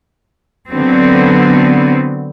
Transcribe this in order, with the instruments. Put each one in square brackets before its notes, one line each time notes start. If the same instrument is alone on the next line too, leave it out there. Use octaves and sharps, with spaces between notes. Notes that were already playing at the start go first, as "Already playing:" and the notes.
[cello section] D3 F#3 B3 C4